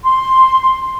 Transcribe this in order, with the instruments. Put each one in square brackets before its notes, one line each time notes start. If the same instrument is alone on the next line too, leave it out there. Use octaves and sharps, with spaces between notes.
[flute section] C6